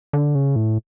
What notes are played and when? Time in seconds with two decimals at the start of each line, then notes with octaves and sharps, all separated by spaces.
0.13 D3
0.35 C#3
0.56 A2